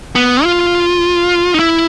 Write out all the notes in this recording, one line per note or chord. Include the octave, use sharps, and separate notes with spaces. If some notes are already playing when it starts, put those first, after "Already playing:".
B3
F4
D#4
E4